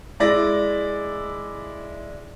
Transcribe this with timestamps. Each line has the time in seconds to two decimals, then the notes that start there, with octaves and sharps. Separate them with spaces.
0.20 G#3 E4 D5 A#6